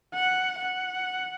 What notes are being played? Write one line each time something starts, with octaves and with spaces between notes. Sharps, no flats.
F#5
F#5